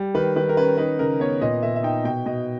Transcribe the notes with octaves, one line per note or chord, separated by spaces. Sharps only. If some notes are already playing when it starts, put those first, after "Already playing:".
Already playing: G3
D#3 B4
D#3 B4
A#4
C#4 B4
D#4 B4
C#3 A#4
B3 C#5
A#2 D#5
A#2 E5
E5
D#4 G5
B2 G5
B2 D#5